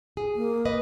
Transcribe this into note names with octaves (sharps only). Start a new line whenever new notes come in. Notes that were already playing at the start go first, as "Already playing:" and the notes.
G#4
A#3
B4 D#5